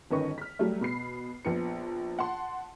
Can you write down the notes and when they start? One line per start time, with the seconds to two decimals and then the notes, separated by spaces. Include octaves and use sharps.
0.11 G1 D#3 C#4 B4 D#5 C#6
0.38 F6 B6
0.59 F#3 G3 A3
0.81 B2 B5 C7
1.45 A#1 F3 B3 C#7
2.19 F#5 A5 C6